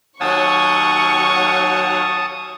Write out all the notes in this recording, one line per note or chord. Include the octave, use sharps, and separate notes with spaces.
D#2 F#3 A5 C#6 D#6